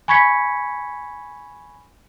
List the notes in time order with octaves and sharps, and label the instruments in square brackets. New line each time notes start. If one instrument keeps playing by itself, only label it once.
[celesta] G#5 B5 C#6 G#6 B6 C#7